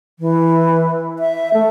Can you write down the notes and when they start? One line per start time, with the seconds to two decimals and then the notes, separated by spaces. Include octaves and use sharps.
0.19 E3
1.19 E5
1.54 A3